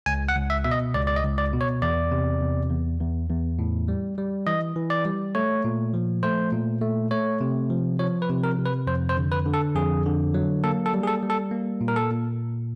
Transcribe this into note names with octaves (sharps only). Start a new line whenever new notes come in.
C#2 G#5
F#5
C#2
E5
B2 E5
D#5
C#2 D5
D5
D#5
C#2
D5
B2
C#5
E2 D5
C3
E2
E2
E2
E2
A2
G3
G3
E3 D#5
E3
D5
G3
A3 C#5
A#2
F3
A3 C5
A#2
A3
A3 C#5
C3
F3
F3 C#5
B4
C3
A#4
C3
B4
F2 C5
C5
D3
B4
D3
A4
F2 G#4
D3
F#3
A#3 A4
A4
G3
G#4
A4
G3
A4
A#3
A#2
A#4
A4
A#2